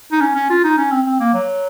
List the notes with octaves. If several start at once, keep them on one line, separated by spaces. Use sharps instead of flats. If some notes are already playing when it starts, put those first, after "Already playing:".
D#4
C#4
C#4
F4
D#4
C#4
C4
C4
A#3
F#3